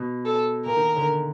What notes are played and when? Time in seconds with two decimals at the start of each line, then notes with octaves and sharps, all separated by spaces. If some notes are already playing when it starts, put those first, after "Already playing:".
Already playing: B2
0.25 A4
0.66 A#2 A#4
0.76 D#3
0.96 D3